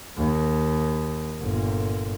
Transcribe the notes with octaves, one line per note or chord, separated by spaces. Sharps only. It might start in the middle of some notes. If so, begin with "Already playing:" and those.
D#2
G1 A#2